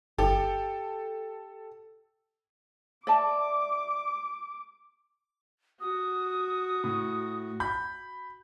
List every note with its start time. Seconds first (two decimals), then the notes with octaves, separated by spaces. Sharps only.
0.18 G1 G4 A4
3.07 D5 E5 A5 D6
5.81 F#4 D#6
6.84 A2
7.60 B5 G6